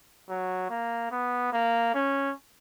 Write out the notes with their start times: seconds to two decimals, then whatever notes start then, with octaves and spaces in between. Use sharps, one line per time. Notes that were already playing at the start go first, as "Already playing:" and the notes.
0.29 F#3
0.70 A#3
1.11 B3
1.53 A#3
1.95 C#4